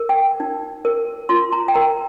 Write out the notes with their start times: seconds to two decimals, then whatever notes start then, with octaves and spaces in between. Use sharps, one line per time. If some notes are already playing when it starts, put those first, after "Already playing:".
Already playing: A#4
0.09 G5
0.40 D#4
0.85 A#4
1.29 F4 C6
1.52 A#5
1.68 G5
1.74 A#4 A#5